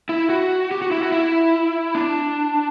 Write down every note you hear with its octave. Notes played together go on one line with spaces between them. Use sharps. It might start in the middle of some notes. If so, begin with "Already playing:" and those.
E4
F#4
G4
F#4
E4
F#4
E4
D4